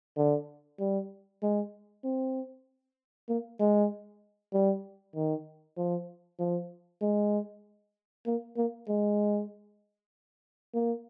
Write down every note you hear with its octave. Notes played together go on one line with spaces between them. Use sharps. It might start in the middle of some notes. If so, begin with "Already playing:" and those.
D3
G3
G#3
C4
A#3
G#3
G3
D#3
F3
F3
G#3
A#3
A#3
G#3
A#3